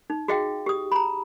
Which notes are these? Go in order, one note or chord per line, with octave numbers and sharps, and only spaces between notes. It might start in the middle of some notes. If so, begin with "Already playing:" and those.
D#4
F#4 G#4 D#5 F5 G5
G4 D#6
A#5 B5